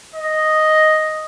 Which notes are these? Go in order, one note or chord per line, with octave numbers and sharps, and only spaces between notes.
D#5